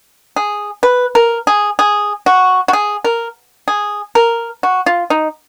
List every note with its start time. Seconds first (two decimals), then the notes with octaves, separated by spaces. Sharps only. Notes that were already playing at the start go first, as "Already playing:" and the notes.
0.36 G#4
0.83 B4
1.15 A#4
1.47 G#4
1.79 G#4
2.26 F#4
2.68 F#4
2.73 G#4
3.04 A#4
3.68 G#4
4.15 A#4
4.63 F#4
4.86 F4
5.10 D#4